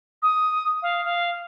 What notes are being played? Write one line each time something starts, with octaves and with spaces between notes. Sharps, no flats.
D#6
F5
F5